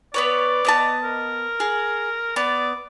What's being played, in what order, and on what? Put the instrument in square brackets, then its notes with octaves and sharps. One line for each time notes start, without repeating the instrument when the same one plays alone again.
[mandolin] B3 B4 C#5 [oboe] D5
[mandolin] B3 D#5 A5
[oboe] A#4
[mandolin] G#4
[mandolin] B3 [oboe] D5